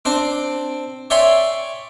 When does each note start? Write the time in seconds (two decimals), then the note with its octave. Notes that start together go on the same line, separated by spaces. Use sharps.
0.05 C4 D4 C5
1.10 C#5 D5 E5 G5 G#5 C6